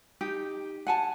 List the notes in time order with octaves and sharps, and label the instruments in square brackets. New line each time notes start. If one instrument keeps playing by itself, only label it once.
[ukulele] D#4 G4
F#5 G#5 A5